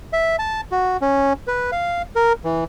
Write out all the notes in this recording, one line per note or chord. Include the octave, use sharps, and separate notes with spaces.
E5
A5
F#4
C#4
B4
F5
A#4
E3